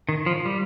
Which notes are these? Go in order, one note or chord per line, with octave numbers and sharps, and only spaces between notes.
D#3
F3
G3